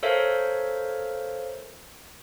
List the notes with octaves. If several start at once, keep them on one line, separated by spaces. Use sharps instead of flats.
A4 A#4 C5 C#5 E5 F5